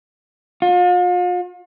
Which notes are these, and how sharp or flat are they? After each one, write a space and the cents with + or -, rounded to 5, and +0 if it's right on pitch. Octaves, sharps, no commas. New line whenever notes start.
F4 +40